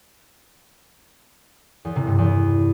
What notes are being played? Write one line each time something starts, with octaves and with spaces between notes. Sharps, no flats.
E2
C3
G2
E2